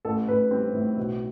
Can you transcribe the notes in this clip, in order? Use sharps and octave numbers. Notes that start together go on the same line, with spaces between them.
A1 A4
A1 B4
G3 C4
A2
B1